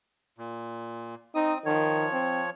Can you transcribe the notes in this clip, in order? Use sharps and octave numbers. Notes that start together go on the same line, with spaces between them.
A#2
C4 D#4 D#6
D#3 F3 C#5
C4